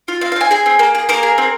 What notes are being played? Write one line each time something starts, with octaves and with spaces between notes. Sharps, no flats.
F4
C4 F5
F5
C4 G#5
G#4 G#5
C4
A#3
G#4
A#3 A#4
G#4
C4